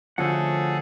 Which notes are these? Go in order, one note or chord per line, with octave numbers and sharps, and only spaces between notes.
D3 F3 A3 C#4 F#4 G#4 A4 F#5